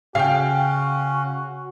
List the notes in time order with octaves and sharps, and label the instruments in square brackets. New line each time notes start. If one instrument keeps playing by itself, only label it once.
[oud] C#3 [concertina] C#4 [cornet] F#4 [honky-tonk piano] F5 G5